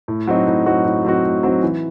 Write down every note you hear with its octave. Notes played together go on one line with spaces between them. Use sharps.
A2
F#3 C4 D#4 F#4
A2
F#3 C4 D#4 F#4
A2
F#3 C4 D#4 F#4
A2
F#3 C4 D#4 F#4
E3